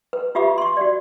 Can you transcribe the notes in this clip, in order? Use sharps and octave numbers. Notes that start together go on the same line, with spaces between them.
B4
F4 G4 E5 B5 D6
C6 C#6
F#4 D5